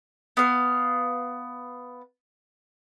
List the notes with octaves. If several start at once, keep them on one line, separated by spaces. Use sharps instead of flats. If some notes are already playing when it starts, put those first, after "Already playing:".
B3 F5